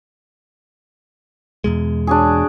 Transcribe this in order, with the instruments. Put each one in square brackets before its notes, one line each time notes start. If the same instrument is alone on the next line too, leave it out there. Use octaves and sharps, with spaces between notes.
[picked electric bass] E2 B2 G#3
[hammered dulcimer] D4 F#4 G#4